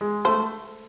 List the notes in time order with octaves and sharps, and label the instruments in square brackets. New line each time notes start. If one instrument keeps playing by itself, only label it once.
[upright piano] G#3
[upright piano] A3 [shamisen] C5